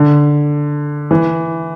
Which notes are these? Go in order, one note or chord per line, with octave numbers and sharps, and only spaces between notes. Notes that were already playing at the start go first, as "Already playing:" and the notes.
Already playing: D3
E3